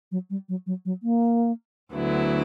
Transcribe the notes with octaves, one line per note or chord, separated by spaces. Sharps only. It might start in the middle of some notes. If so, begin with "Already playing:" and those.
F#3
G3
F#3
F#3
F#3
A#3
D2 D3 F#3 B3 E4